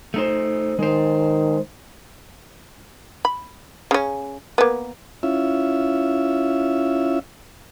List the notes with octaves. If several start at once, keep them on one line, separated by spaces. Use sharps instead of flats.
A3 D#4 C5
D#3 G#3 C5
B5
C#3 C#4
A#3 B3
C#4 E4 F4 E5